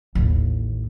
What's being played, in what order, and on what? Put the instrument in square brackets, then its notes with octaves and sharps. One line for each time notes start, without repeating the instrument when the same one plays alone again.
[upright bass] A1 D#2